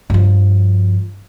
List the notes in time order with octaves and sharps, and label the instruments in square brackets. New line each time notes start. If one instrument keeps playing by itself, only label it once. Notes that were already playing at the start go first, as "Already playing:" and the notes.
[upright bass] G2 F3